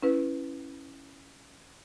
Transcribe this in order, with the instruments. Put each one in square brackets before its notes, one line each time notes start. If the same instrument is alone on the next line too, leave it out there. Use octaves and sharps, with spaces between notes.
[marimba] C#4 E4 B4